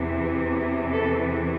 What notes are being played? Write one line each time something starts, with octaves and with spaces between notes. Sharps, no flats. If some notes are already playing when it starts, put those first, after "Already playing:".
Already playing: E2 C3 E3
A4